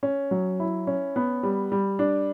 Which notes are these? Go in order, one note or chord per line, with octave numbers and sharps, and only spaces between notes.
C#4
F#3
E4
C#4
B3
G3
G3
D4